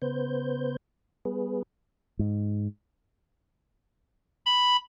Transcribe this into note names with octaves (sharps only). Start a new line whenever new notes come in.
C#3 B3 B4 C5 G6
G3 B3 G#4 B4
G#2
B5